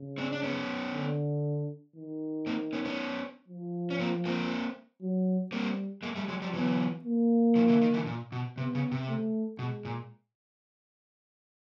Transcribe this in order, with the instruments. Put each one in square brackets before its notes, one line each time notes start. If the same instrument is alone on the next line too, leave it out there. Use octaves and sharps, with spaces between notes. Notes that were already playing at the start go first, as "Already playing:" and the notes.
Already playing: [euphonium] C#3
[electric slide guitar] C4 D4
D4
B3 C#4
[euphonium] D3
D#3
[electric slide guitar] A#3 C4
B3 C#4
B3 C#4
[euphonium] F3
[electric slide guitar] C#4
A#3 C4
A#3 C4
[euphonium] F#3
[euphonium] G3 [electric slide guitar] A#3 C4
[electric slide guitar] G#3 A#3
G3 A3
F#3 G#3
F3 G3
[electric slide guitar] E3 F#3 [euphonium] B3
[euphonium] A#3
[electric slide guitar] D#3 F3
D3 E3
D#3
D3 E3
A#2
B2
[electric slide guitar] C3 [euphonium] B3
[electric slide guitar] C#3
C3
[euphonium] A3
[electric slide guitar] B2 [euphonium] G#3
[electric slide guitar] A#2